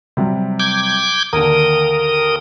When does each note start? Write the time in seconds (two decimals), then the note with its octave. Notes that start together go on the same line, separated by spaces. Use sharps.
0.17 C3 F#3 G3
0.60 D6 G6 G#6
1.33 D#2 D3 A#4 D#6